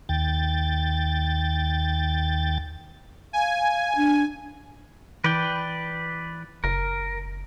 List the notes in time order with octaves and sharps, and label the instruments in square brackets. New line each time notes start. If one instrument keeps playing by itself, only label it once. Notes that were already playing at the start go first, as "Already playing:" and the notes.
[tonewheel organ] D#2 G5 A6
[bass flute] F5 [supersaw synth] G#5
[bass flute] D4
[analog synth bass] E3 [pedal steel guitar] B4 D5 G5
[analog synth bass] F#1 [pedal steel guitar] A#4